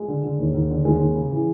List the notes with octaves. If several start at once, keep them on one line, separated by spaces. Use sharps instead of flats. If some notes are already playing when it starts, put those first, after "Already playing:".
Already playing: G#3
D3
D3
D#2
D#2
D3
D#2 G#3
D#2
C#3
E3